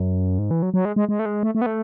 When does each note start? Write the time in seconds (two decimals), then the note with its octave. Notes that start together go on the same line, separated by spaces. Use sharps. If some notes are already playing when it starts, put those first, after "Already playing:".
Already playing: F#2
0.39 G#2
0.51 E3
0.62 F#3
0.74 F#3
0.85 G#3
0.96 G#3
1.09 G#3
1.19 A3
1.26 G#3
1.43 A3
1.55 A3
1.62 B3
1.66 A3